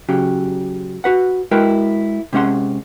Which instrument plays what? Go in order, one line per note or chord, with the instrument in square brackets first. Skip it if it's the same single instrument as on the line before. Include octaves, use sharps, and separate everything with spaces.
[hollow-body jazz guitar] C#3 F#3 G4
F#4 B4 F#5
G#3 E4 F#4 A#4 B4 G5
C3 G#3 C#4 F#5 C6